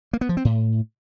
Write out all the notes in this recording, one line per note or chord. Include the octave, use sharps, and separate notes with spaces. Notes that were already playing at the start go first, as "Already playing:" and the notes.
A#3
B3
F3
C4
A2